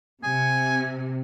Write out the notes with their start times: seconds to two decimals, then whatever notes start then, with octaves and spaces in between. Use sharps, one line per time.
0.23 C3 G#5